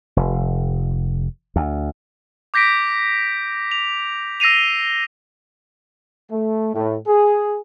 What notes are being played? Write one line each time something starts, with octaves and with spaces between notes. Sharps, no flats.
F1
D2
D6 G6 A#6 B6 D7
F7
E6 A#6 C7 D#7 F7
A3
A2
G#4